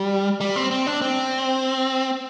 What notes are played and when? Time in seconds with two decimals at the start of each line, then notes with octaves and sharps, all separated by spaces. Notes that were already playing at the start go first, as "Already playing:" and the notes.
Already playing: G3
0.40 G3
0.56 C4
0.71 C4
0.87 D4
1.02 C4